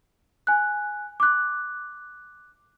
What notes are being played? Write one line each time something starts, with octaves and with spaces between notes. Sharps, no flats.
G#5 F#6
D6 F#6